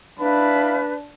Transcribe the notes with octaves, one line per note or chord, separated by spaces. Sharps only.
D4 E4 B4 F5 B5